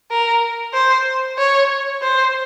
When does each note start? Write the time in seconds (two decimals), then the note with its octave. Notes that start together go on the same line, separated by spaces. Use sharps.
0.11 A#4
0.74 C5
1.38 C#5
2.02 C5